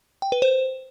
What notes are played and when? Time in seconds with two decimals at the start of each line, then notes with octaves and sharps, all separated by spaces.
0.22 G5
0.32 B4
0.42 C5